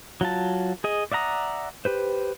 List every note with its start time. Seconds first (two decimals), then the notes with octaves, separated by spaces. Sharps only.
0.21 F#3 F4 A5
0.84 G#4 D#5
1.12 D5 E5 F#5 A#5 D#6
1.85 G4 B4 C5